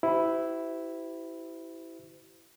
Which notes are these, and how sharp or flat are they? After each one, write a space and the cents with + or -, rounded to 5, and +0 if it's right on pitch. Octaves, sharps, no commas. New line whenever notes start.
E4 +0 G4 -35 C5 -40